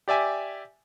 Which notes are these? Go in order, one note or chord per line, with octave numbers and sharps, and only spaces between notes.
G4 D5 E5 G#5